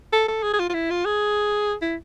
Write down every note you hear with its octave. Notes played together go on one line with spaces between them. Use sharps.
A4
A4
G#4
G#4
F4
F4
E4
F4
G#4
E4